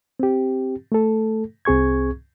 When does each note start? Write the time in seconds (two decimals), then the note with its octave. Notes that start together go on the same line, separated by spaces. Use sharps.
0.20 C4 G4
0.92 A3 A4
1.65 C2 C4 G#4 C#6 G#6